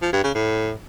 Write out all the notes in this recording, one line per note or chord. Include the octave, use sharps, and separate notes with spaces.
F3
G2
C#3
A2